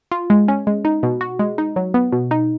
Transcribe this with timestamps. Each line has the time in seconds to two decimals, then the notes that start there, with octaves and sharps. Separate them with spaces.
0.12 F4
0.30 G#3
0.48 C#4
0.67 G#3
0.85 D#4
1.03 B2
1.21 F#4
1.39 G#3
1.58 D#4
1.76 F#3
1.94 B3
2.12 B2
2.31 D#4